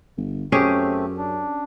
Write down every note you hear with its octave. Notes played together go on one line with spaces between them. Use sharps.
G1
F#2 A3 C4 C#4 G4 G#4
D4